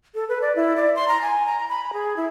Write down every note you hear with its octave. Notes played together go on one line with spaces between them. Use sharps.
A4
B4
D5
E4
D5
C6
A#5
G#5
A#5
B5
G#4
E4